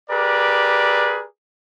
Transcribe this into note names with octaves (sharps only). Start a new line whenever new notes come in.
G4 G#4 A#4 B4 D5